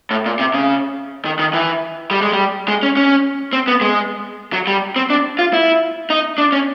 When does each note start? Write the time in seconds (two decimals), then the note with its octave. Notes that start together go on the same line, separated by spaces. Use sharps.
0.11 A2
0.26 A#2
0.39 C3
0.54 C#3
1.25 D#3
1.39 D#3
1.53 E3
2.11 G3
2.22 G#3
2.33 G3
2.68 G#3
2.83 C#4
2.97 C#4
3.53 C4
3.68 B3
3.81 G#3
4.53 F#3
4.67 G3
4.96 C4
5.10 D4
5.39 F4
5.53 E4
6.10 D#4
6.38 D4
6.53 C#4